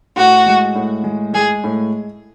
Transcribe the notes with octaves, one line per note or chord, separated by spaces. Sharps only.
A2 F#4
G#3
A2
G#3
G#3 G#4
A2